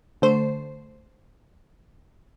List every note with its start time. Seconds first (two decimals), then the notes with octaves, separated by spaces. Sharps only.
0.22 D3 A3 C5